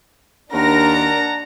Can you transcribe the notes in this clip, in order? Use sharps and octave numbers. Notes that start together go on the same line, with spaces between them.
D#2 D4 A#4 F#5 A5 A#5 A#6